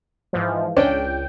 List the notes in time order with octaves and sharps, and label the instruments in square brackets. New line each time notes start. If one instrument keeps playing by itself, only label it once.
[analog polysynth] G#2 E3 F3
[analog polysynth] C#2 G5 [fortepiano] C#4 D4